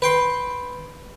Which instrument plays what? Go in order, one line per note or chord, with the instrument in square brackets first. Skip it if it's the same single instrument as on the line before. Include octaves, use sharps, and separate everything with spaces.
[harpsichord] B4 G5 C6